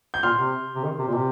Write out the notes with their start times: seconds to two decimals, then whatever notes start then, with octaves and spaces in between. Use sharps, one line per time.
0.14 G6
0.23 A#2 C6 F6
0.38 C3
0.75 C3
0.84 D#3
0.99 C3
1.08 A#2
1.14 C3